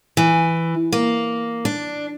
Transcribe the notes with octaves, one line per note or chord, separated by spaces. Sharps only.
E3
A#3
D4